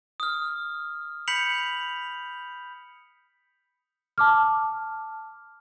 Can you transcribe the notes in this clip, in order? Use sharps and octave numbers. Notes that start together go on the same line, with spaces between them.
D#6 F6
B5 G6 B6 C#7 F7 F#7
A5 D6 F6